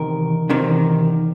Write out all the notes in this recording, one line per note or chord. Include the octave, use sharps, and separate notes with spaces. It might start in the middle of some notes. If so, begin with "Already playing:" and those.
Already playing: E2 C3 D#3 A#4
E2 C3 D#3